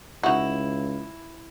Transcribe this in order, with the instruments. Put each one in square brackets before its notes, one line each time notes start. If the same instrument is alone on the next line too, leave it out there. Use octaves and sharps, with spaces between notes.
[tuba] C#2 [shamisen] D#4 F#4 [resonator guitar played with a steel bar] E4